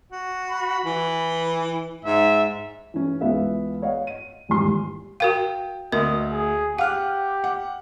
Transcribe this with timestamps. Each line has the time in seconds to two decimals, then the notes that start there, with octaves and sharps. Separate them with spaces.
0.12 F#4
0.50 B5
0.85 E3
2.05 G#2 E5
2.94 E3 C#4
3.20 C#2 E3 B3 E5 F5
3.82 C#5 D#5 F5 F#5
4.07 D#7
4.49 D#1 E2 G#2 G4 C6
5.20 F#4 A#4 F5 G5
5.92 D2 A#4 D#5
6.32 G#4
6.78 G4 F5 F#5 F6 F#6
7.44 F#5